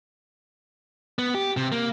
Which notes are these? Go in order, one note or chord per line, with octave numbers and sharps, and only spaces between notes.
B3
G4
C3
A#3